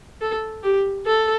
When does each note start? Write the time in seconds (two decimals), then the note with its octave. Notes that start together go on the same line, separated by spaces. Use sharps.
0.21 A4
0.63 G4
1.06 A4